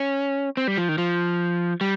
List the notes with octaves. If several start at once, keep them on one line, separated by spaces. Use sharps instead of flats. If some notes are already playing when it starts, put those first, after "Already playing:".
Already playing: C#4
C4
G3
F3
D#3
F3
G3